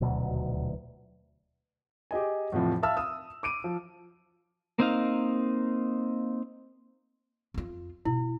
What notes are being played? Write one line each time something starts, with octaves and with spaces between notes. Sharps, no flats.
D#1 D2 B2 F#3
G4 G#4 D#5 G#5
E2 A2 C3 F3
E5 F5 A5 E6 F6
D#6 E6
D6 D7 D#7
F3
A#3 C4 D#4 F5
F2 F4
B2 E4